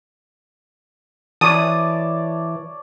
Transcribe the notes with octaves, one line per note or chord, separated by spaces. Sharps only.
E3 C#5 D5 A5 D#6